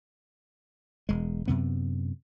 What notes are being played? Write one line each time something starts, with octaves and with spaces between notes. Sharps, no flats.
E1 G#3
F#2 C3 B3